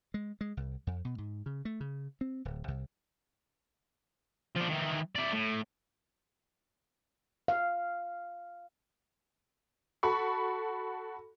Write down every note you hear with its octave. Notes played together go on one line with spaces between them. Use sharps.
G#3
G#3
C2
F2
B2
G#2
C#3
A3
C#3
C4
D1
C2
F3 D4
D#3 E3
E4 D5
A2
F5
F#4 A4 B5 C#6